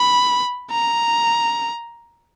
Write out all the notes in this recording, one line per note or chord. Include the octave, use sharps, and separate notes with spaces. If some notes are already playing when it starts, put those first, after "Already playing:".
Already playing: B5
A#5